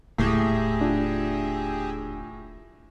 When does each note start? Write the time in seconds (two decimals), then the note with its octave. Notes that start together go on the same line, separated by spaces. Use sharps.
0.18 D#1 D2 A2 G4 G#4 E5
0.81 D4 F4